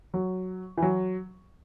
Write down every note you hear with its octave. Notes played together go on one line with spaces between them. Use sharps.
F#3
E3
F#3